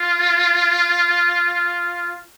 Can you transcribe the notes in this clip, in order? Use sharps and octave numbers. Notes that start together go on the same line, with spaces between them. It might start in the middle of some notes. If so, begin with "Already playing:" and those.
Already playing: F4